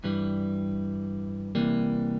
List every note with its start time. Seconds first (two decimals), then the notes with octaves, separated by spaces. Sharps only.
0.04 G2 E3 G3
1.55 C3 E3 G3 A#3